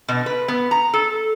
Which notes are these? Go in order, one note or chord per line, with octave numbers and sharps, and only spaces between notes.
B2
B4
B3
A#5
A4